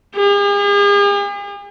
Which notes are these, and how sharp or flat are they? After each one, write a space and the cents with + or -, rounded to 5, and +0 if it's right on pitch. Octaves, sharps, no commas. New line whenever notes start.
G#4 -45